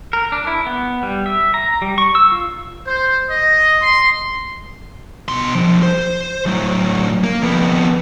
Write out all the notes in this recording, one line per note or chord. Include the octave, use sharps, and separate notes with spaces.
A#4
D4
E4
B3
G3
E5
A#5
G3
C#6
E6
F4
C5
D#5
C6
B2 C6
F3 D4
C5
A2 F#3
A#3
F2 B3